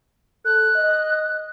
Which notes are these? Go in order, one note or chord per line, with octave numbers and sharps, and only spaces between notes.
A4 F#6
D#5